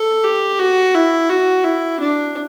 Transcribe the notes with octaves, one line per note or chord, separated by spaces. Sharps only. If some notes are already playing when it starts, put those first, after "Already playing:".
Already playing: A4
G4
F#4
E4
F#4
E4
D4